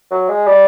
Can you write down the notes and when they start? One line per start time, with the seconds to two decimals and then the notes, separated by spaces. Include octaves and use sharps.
0.11 F#3
0.28 G#3
0.47 G3